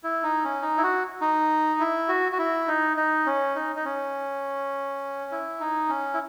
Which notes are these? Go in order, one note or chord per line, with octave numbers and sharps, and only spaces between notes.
E4
D#4
C#4
D#4
E4
F#4
D#4
E4
F#4
F#4
E4
D#4
D#4
C#4
D#4
D#4
C#4
E4
D#4
C#4
E4